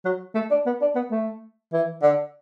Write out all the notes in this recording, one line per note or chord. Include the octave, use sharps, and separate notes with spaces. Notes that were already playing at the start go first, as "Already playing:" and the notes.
F#3
A3
D4
B3
D4
B3
A3
E3
D3